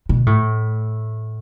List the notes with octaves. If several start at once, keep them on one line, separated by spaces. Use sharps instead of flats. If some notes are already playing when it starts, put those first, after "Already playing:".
B2
A2